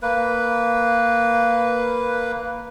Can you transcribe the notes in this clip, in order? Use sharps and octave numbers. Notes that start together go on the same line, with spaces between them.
A#3 B4